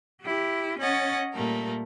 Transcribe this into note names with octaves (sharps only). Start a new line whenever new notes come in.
E4 G4
C#4 C#5 D#5 F#5 A6
A#2 G3 A3 A#4